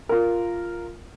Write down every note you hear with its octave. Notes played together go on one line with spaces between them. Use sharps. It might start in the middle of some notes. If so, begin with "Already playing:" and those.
F4 A#4